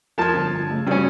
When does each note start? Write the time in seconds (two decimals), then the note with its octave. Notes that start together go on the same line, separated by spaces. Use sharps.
0.18 F3 A#4 A5 G#6
0.34 G1
0.70 C#3 A3
0.87 G2 C#3 C#4 F#4